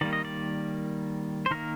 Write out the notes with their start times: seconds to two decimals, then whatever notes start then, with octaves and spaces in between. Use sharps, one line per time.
0.01 D#3 G3 A#3 D5
0.13 D#5
0.25 D5
1.46 C5
1.51 D#3 A#3 A#4